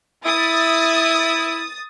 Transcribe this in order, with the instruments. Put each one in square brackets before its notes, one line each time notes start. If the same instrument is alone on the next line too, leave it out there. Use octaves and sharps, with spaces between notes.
[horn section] E4 [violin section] D#6 A6